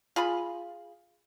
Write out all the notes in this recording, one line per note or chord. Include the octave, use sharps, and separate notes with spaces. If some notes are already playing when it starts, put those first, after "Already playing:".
F4 G#4 B5